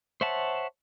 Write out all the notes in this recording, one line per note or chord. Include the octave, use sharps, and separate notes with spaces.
C5 C#5 E5 F#5 A5